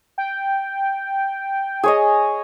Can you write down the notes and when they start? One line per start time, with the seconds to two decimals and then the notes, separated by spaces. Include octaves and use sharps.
0.18 G5
1.83 G#4 C#5 D#5